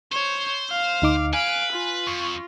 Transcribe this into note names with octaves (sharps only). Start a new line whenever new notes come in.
C5 C#5
F5
D2 D#4 D6
B4 F5 G#5 D7
F4
F2 C#6